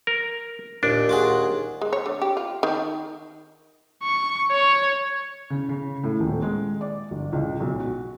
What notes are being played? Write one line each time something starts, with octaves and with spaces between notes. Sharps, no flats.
A#4
D#2 A#2 D4
F4 F#4 G#4
G#3
C#5
D3
G4
F4
D#3
C#6
C#5
C#3
C#3
A2
D#1
G#3
D5
G1
C#2
B1
F#4